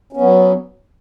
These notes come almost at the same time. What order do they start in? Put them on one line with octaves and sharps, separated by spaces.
C#4 B3 F#3